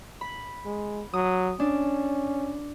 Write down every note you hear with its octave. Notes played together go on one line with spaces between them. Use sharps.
B5
G#3
F#3 D#6
C#4 D4